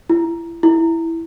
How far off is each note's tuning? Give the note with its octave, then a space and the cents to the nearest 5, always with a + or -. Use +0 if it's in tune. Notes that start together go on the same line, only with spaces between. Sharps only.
E4 +30
E4 +0